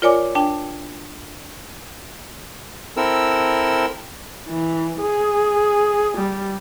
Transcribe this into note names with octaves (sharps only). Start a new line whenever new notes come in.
F4 A#4 C#5 D5 G#5 D6
D4 G5 A5
C4 E4 A4 A#4 E6
E3
G#4
G3